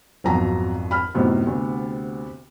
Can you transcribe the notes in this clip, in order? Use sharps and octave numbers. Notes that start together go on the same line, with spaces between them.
G#1 F2 B2 F#3 A#5
B5 F6
F#2 A2 C3 B3 D#4
D2